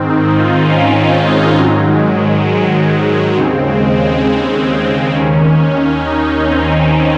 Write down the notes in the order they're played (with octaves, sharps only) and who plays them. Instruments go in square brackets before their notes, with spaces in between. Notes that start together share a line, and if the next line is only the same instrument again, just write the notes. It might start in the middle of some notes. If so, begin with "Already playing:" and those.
Already playing: [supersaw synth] G#2 D#3 C4
D#4
F4
C#4
C4
G#3
G#2 D#3 F#3
G#3
G#3
F#3
G#3
G#3
D#2 C#3 C4
G#3
G#3
C4
C4
D#2 D#3 C#4
C#4
D#4
C4